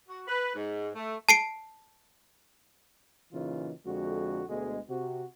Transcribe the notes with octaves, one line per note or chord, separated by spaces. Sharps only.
F#4
B4
G#2
A3
A5 C7 D7
A#2 C#3 E3 F#3 D#4 F4
F2 D3 G#3 F#4
D2 B2 G#3
C3 F#4